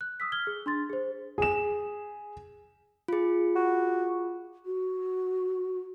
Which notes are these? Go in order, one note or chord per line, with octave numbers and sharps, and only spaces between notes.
F#6
D#6 E6 B6
F6 G#6 G7
G#4
D4 C6 A6
G#4 C5
G#4 E7
F4 G#4
F#4
F#4